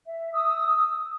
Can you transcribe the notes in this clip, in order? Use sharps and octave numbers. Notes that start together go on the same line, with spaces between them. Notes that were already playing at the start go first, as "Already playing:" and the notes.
E5
D#6 E6